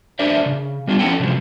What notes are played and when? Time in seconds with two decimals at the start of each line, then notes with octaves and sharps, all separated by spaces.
0.19 D4 A#4 C5 D5 E5
0.46 C#3
0.88 G3 B3 D4 F4
0.99 F3 C#4 E4 A4 F#5 G5
1.20 C3 F3 F#3 G#3